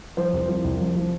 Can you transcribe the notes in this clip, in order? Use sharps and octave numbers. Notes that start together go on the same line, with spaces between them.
F3 C5
C2
F3
C2
F3
F3